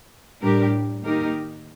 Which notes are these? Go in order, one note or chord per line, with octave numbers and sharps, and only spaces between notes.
A2 G3 D4 G4 A#4
D#3 A#3 D#4 G4 A#4